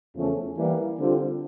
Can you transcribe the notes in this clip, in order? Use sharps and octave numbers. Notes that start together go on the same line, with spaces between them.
E2 C#3 F3 A3 C#4
E3 G3 A#3
D3 G3 C4 F4